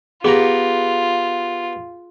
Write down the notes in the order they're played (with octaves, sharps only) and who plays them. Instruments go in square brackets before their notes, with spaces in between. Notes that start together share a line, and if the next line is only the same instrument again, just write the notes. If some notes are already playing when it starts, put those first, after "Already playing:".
[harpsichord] B3 G4 A#5 [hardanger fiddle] F4 [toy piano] G#4